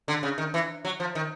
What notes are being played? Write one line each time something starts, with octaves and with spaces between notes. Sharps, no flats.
D3
C#3
D#3
E3
F#3
F3
D#3